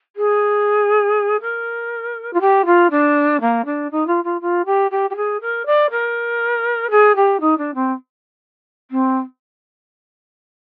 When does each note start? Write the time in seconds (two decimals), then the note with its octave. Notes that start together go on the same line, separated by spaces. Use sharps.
0.16 G#4
1.41 A#4
2.33 F4
2.41 G4
2.66 F4
2.91 D4
3.41 A#3
3.65 D4
3.91 D#4
4.07 F4
4.24 F4
4.41 F4
4.66 G4
4.91 G4
5.10 G4
5.16 G#4
5.41 A#4
5.66 D5
5.91 A#4
6.91 G#4
7.16 G4
7.41 D#4
7.58 D4
7.75 C4
8.91 C4